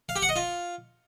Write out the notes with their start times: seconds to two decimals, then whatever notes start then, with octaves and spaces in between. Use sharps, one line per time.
0.09 F5
0.16 G4
0.22 F#5
0.29 D#5
0.36 F4